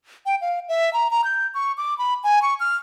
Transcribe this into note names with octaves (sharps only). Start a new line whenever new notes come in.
G5
F5
E5
A#5
A#5
G6
C#6
D6
B5
G#5
C#6
F6